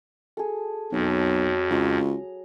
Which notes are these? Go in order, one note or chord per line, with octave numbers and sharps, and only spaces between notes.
G#4 A4
B1 F2 F#3
C#2 A#5